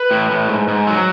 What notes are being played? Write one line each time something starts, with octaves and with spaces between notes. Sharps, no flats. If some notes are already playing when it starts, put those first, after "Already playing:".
Already playing: B4
A2
A2
G#2
G#2
F#3